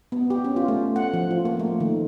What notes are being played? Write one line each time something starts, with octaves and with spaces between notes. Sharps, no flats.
B3
G4
C#4
F4
A3
F#5
F3
F4
A#3
A3
D#3